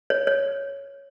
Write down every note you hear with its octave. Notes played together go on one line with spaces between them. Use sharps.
C#5
C#5